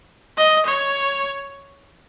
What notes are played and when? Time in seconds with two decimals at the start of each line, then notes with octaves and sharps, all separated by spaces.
0.38 D#5
0.66 C#5